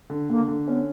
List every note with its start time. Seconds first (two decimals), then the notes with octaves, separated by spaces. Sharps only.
0.10 D3
0.29 D3 A#3
0.48 D3
0.67 B3 C#4